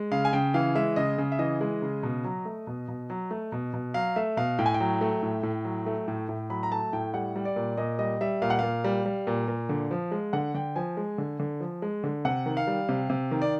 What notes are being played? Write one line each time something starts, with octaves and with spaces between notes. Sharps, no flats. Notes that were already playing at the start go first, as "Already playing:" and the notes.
Already playing: G#3
C#3 F5
G#5
C#3 G5
E3 F5
G#3 E5
C#3 D#5
C#3
E5
E3 D#5
G#3
C#3
B2
F#3
A3
B2
B2
F#3
A3
B2
B2
F#3 F5
A3 E5
B2 F5
A2 G5
G#5
G5
F#3
A3
A2
A2
F#3
A3
A2
A2
F#3 B5
A#5
A3 A5
A2 G5
G3 F#5
G3
D5
A#2
A#2 D#5
G3 D#5
G3 E5
A#2 F5
F#5
A#2 F5
G3
G3
A#2
A#2
D3
F3
G#3
D3 F#5
D3 G5
F3 G#5
G#3
D3
D3
F3
G#3
D3
C3 F#5
D#3
F5
G3
C3
C3
D#3
D5